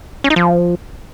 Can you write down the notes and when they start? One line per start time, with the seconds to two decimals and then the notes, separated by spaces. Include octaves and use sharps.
0.24 C#4
0.30 D#4
0.36 F3